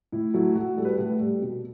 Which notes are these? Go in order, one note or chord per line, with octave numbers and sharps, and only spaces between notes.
A2 E4
F#3 A3 E4
A2 F#4
G3 A4
B4
A4
A2
G3
B2